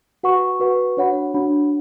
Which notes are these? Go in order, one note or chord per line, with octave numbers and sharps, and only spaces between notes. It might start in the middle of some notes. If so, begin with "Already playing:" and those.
F#4 B4 F#5 C#6
F#4 B4 F#5 C#6
D4 F#4 C#5 F#5 B5
D4 F#4 C#5 F#5 B5